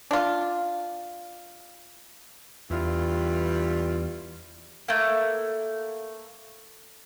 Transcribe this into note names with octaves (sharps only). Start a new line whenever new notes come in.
D4 F4
E2 G2 E3 G3 F4
A3 A#3